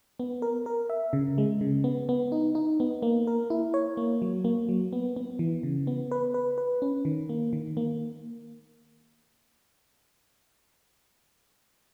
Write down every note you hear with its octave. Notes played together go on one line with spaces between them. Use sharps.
B3
A#4
A#4
E5
C#3
G#3
C#3
B3
B3
D#4
D#4
B3
A#3
A#4
E4
C#5
A#3
F#3
A#3
F#3
B3
B3
E3
C#3
B3
B4
B4
B4
C#4
D#3
A#3
D#3
A#3